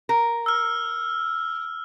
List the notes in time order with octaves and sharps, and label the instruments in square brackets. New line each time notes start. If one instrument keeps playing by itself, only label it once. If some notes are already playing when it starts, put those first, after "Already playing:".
[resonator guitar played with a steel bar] A#4
[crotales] E6 F6